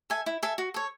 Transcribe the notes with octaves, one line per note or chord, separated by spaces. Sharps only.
A4 E5 G#5
E4
A4 E5 G#5
F#4
A4 C#5